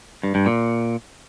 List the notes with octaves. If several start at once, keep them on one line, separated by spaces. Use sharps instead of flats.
G2
G2
A#2